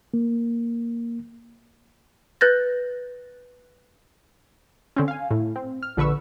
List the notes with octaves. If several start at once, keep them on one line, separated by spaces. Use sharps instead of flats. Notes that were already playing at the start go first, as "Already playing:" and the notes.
A#3
B4 F#6 G6 A6 A#6
D3 C4 C#4
F5 G#5
A2
C4
F6
A#1 D3 B4 C#6 E6